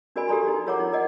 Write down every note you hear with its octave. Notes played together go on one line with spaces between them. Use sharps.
D4 F#4 A#4 D5 G#5 B5
G4 A4 D5 A#5 C6
D#4 E4
F4 A#4 C#5 F#5 A#5 D6
D#4
A#4 D5 D#5 F#5